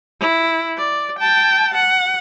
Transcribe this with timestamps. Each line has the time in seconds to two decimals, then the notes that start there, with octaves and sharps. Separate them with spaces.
0.20 E4
0.77 D5
1.19 G5 A5
1.74 F#5